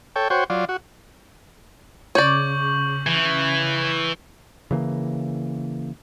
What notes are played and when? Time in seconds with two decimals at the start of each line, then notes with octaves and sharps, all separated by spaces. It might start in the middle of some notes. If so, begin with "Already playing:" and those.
0.16 A4 C#5 G5
0.30 F#4 C5 C#5 G5
0.50 F#3 F4 D5
0.69 F#4
2.15 C#3 C#5 D5 C#6 G6 F#7
3.07 E3
4.71 C#3 E3 A#3